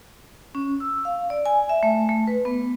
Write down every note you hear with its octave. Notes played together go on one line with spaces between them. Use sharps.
C#4
E6
F5
D5
G#5
E5
A3
A3
B4
B3